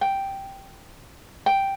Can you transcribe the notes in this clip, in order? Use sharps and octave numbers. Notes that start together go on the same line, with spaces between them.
G5
G5